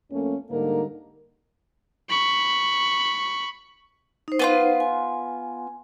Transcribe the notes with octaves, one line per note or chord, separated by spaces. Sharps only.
F2 A3 A#3 C#4
G#2 D3 G3 A#3 D#4 A#4
B5 C#6
D#4 C5
B3 D4 F4
G#5